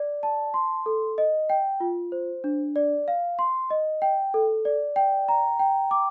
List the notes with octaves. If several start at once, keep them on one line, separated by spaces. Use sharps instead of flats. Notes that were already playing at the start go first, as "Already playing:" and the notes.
Already playing: D5
A5
C6
A4
D#5
G5
F4
C5
D4
D5
F5
C6
D#5
G5
A4
D5
G5
A#5
G5
D6